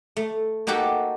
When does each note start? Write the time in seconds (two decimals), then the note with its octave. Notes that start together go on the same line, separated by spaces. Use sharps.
0.16 A3
0.67 A#3 D#4 F#4 G4 A4